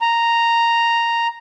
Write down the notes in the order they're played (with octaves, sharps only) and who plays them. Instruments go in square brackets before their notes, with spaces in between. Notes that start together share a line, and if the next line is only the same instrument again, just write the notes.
[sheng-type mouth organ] A#5